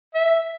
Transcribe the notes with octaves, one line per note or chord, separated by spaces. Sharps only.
E5